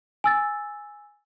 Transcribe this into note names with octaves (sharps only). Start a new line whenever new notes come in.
G#5 E6 A6